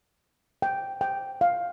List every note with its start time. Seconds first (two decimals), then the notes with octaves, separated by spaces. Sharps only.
0.62 G5
1.01 G5
1.41 F5